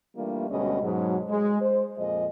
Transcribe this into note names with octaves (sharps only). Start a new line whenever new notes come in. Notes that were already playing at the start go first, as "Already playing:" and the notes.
E3 G3 A3 A#3 D4 F4
D2 B2 G3 G#3 C#4 D#5
G#2 B2 F#3
G#3
C5
F2 A#2 F3 G#3 D#5